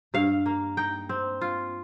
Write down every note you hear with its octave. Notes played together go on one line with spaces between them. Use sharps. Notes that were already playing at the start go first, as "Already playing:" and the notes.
G2 F5
A#3
D#4 G5
C4
F4